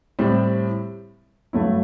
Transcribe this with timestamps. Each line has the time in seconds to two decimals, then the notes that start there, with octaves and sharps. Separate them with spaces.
0.19 A2 G3 C4
1.53 G2 F#3 A3 E4